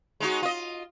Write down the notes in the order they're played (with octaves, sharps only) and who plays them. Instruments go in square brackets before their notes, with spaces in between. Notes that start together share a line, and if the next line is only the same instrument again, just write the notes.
[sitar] G#3 D#4 F#4
F4 D#5